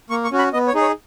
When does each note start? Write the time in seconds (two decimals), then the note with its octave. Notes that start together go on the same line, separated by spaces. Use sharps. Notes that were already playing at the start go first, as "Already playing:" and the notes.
0.10 A#3 C#6
0.24 C#6
0.32 C#4 F#4
0.39 B5
0.53 B3 D#5
0.68 C#5
0.75 D#4 G#4
0.81 C#5